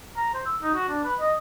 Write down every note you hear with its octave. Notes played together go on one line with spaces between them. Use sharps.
A#5
C5
E6
D#4
F#4
D4
B4
D#5